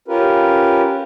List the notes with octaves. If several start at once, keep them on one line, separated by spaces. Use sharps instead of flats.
C#4 F4 G4 A#4 B4